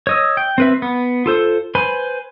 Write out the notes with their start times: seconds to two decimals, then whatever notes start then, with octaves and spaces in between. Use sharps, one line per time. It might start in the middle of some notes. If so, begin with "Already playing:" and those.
0.07 C#5 D#5 E6
0.37 G5
0.58 C4 B4 E5
0.82 B3
1.26 F4 A4 C5
1.75 B4 C5 G#5 B5